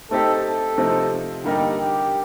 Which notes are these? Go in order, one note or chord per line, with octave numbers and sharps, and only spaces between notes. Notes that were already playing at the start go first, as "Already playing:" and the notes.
A3 C4 D#4 G4 A4
A4
C3 F3 A3 C4 D#4
D3 G3 A#3 D#4 G4
G4